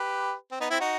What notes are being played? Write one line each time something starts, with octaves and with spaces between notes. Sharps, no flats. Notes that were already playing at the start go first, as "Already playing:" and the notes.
Already playing: G4 B4
C4
B3 D#4
C4 E4
D#4 F#4